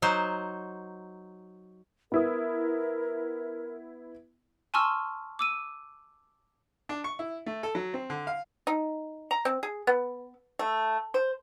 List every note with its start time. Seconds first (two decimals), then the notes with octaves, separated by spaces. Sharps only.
0.02 F#3 D#4 C5
2.12 B3 E4 A#4 D#6
4.74 G#5 A5 C6 C#6 E6 F6
5.39 D6 E6 D#7
6.89 D4
7.04 C#6
7.19 E4
7.46 A3
7.63 A4
7.75 F#3
7.94 C4
8.10 D3
8.27 F5
8.67 D#4
9.31 A#5
9.45 C4
9.63 G#4
9.87 B3
10.59 A3
11.14 C5